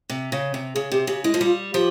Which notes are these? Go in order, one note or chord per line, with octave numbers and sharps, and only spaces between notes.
C3
C#3
C3
C#3 G#4
C3 G4
C#3 G4
G#3 E4
F3
G3 F4
F3 G4